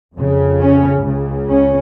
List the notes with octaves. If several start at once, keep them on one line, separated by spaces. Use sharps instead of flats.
F2 C#3
C#4
C#2 C#3
C#4